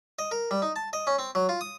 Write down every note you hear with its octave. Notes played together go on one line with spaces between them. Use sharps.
D#5
A#4
G3
D#4
A5
D#5
C#4
C4
F#3
F4
D#6